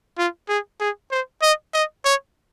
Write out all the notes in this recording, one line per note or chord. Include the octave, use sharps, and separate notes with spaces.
F4
G#4
G#4
C5
D#5
D#5
C#5